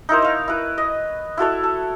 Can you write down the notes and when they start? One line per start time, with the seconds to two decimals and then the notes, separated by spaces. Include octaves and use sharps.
0.09 D#4 E4 A#4 C5
0.22 C#5 F5
0.48 E4 B4
0.78 D#5
1.37 E4 F#4 A4 C#5
1.63 A4